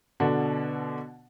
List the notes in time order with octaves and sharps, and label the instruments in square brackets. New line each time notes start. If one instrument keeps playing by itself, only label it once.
[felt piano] B2 D3 D4 F#4